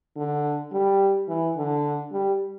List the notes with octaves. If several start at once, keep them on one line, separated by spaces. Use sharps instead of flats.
D3
G3
E3
D3
G3